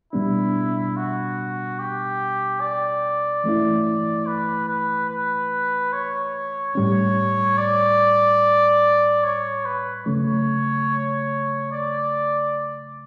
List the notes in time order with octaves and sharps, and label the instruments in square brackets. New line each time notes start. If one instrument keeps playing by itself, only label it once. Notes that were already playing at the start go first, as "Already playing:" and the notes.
[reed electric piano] B2 G3 B3 D4 [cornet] E4
[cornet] F#4
G4
D5
[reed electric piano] E3 A3 C#4 E4
[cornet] B4
B4
B4
C#5
[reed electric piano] A2 G3 C#4
[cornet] D5
C#5
B4
[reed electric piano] C#3 F#3 A3 C#4 [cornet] C#5
[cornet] D5